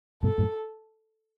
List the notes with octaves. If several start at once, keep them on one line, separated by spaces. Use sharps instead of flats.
G2 B2 A4
F#2 A2